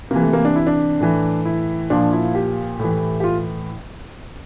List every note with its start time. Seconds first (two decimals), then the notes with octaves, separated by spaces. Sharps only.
0.11 C3 E3 A#3
0.23 A3
0.33 A#3
0.45 D4
0.56 E4
0.67 D4
1.00 A2 E3
1.45 E4
1.90 A#2 F3 D4
2.12 E4
2.35 G4
2.80 A2 E3
3.20 G4
3.24 F4